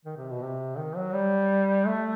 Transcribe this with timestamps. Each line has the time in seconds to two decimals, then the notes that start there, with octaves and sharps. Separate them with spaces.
0.05 D#3
0.17 C3
0.30 B2
0.42 C3
0.78 D#3
0.96 F#3
1.13 G3
1.86 A3